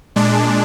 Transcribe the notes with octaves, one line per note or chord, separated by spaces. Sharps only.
A#2 G#3 D4